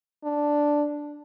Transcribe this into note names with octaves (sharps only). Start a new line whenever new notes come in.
D4